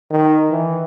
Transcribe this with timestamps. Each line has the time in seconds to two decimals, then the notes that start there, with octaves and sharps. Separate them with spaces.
0.11 D#3
0.51 E3